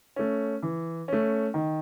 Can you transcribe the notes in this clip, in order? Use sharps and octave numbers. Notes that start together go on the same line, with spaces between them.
A3 C#4
E3
A3 C#4
D#3